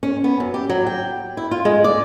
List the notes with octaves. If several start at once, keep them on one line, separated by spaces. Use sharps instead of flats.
C#4
B3
F#2
G4
F#3
G5
E4
F4
G#3
D5